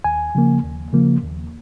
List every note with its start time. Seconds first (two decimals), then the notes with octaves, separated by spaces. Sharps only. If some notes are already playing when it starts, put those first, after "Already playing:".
0.04 D#2 G#5
0.35 C#3 F3 A#3
0.64 D#2
0.92 C#3 F3 A#3
1.23 D#2